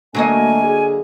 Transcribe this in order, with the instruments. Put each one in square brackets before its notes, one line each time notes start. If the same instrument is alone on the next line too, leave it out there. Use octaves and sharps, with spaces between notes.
[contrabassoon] D3 [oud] F#3 A#3 D#5 [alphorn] A3 [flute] G#5
[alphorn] G#4